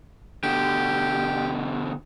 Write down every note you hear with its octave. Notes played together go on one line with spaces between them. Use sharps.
B2 D3 G4